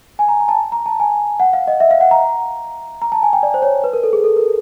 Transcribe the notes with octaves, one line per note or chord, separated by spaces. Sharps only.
G#5
A#5
A#5
A5
A#5
A5
G#5
F#5
F5
D#5
E5
F5
F#5
A#5
A#5
A5
G#5
G5
D5
C5
C#5
B4
A#4
A4
G#4
A4
A#4